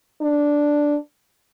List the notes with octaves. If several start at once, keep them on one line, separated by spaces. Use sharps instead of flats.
D4